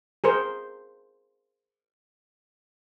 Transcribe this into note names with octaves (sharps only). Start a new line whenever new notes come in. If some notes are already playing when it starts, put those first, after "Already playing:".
G#4 A#4 C5